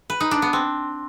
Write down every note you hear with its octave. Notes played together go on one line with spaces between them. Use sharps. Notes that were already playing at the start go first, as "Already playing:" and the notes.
B4
D#4
D4
B3
C4